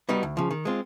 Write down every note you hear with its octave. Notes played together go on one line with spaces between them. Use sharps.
G3 B3 D#4 F#4
D2
C#3 F3
D#3
G#3 C4 F4